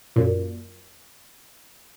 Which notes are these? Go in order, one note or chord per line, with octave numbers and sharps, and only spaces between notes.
F#2 A#2